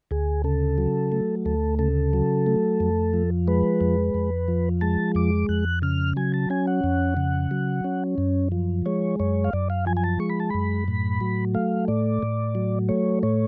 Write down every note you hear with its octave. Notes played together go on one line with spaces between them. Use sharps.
D2 G#4
C#3 A4
F#3
A3
D2 A4
C#3 A4
F#3
A3
F2
F3
G#3 B4
F2
F2
F3
G#3 A5
F2 D6
F2 F#6
C#3 F6
F#3 G#5
A5
C#4 G#5
F#5
F2
C#3
F#3
C#4
F#2
F3
G#3 C#5
F#2 C#5
F5
F#2 D5
F5
F3 G#5
G#5
A5
G#3 C#6
B5
A5
F#2 B5
A2
F#3
A3 F5
A2 D5
A2
F#3
A3 C#5
A2 C#5